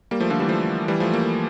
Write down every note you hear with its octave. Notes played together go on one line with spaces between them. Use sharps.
G3 A#3
F3 A3
D3 F3
E3 G3
F3 A3
E3 G3
F3 A3
G3 A#3